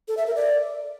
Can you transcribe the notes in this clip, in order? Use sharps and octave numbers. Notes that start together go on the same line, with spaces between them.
A4
E5
A#4
D5